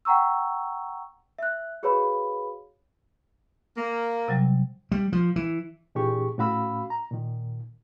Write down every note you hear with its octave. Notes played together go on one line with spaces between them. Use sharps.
F#5 G5 A#5 C#6 E6
E5 F#6
F#4 G#4 B4 C#5 F5 B5
A#3
C3 F#3 G3
G3
F3
E3
A#2 E3 D4 G4 G#4 C#6
A2 C#4 F#4 F5 B5 E6
A#5
A#2 D#3